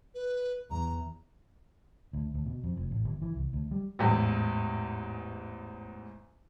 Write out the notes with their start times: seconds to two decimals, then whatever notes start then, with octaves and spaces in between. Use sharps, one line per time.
0.15 B4
0.71 E2 A#5
2.13 D2
2.34 D2
2.46 B2
2.63 F2
2.77 F1
2.91 A1
3.05 G1
3.22 E3
3.35 C2
3.53 D2
3.71 G3
3.99 A1 E2 G#2